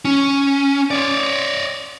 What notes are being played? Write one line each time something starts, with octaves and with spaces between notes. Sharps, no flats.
C#4
C#5 D5